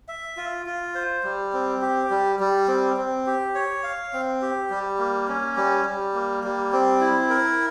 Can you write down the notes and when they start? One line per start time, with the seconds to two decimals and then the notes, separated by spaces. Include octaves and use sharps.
0.08 E5
0.37 F4
0.66 F4
0.95 C5
1.24 G3
1.53 C4
1.82 G4
2.10 G3
2.40 G3
2.68 C4
2.97 C4
3.27 G4
3.55 C#5
3.84 F5
4.13 C4
4.42 G4
4.70 G3
4.99 A#3
5.28 C#4
5.56 G3
5.85 G3
6.14 A#3
6.44 G3
6.72 C4
7.01 E4
7.30 A#4